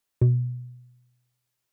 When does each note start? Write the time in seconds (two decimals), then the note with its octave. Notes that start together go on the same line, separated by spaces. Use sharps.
0.21 B2